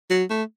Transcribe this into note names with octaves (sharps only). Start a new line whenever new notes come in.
F#3
A3